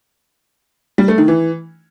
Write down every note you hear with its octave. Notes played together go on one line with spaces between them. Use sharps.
G3
A3
D#3
E3